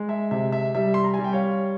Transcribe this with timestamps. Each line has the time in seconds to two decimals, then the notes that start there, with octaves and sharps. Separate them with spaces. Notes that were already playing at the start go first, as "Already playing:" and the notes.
Already playing: G#3
0.09 E5
0.31 C3 E5
0.52 E5
0.75 G3 E5
0.94 C6
1.04 A#5
1.14 G#5
1.19 G3
1.24 G5
1.33 C#5 F5